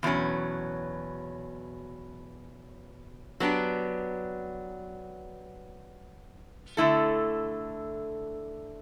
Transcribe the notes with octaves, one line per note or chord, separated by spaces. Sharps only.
E2 B2 F#3 C#4
F#3 B3 D4 G4
D3 A3 E4 A4